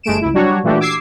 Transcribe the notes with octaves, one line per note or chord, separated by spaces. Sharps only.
G1 G#3 A3 D7 E7
C#2 E4
F#3 G3 D4 F#4 C#5
A#2 E3 A3 D4 F#4 G4
D6 E6 G#6 C7